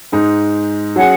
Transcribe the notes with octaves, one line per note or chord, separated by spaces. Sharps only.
G#2 G#3 D#4
F#3 C#4 G#4 F#5